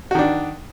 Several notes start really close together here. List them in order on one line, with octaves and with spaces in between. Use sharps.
F#4 D#3 D4